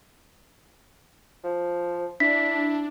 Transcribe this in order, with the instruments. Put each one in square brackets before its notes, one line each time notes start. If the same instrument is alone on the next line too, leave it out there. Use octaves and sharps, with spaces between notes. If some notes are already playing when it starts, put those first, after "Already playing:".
[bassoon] F3
[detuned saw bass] D4 [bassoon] E4 [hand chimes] B6